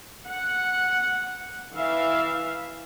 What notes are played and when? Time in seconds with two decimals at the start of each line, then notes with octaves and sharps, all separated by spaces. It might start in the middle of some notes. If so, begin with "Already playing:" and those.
0.28 F#5
1.75 E3 E5 F5